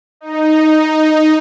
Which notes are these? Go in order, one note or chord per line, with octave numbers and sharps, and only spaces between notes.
D#4